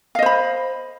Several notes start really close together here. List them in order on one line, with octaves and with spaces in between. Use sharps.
F5 D#5 C5 B5